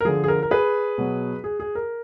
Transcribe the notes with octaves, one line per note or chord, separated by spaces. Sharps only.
A#4
D3 F3 G#4
G#4
A#4
A#4
G#4 B4
B2 F#3
G#4
G#4
A#4